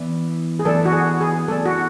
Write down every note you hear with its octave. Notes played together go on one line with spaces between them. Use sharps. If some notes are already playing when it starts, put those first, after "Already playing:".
Already playing: E3 B3 E4 B4 D5
G#4
E3 B3 E4 A4 B4 D5
F#4
G#4
G#4
E3 B3 E4 A4 B4 D5
F#4